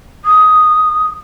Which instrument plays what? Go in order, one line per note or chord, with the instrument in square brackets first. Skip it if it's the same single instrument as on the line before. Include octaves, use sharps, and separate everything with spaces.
[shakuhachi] D#6